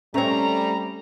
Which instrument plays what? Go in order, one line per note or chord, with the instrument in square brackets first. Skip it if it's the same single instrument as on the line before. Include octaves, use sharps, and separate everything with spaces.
[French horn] G3 [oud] A3 C4 [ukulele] C#4 C5 C#5 [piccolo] A#5